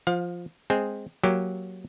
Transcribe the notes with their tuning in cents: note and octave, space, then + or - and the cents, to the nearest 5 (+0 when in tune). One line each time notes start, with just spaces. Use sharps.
F3 +0 F5 +30
G#3 +0 C4 +0 G#4 +0
F#3 +0 A#3 +0 G4 +0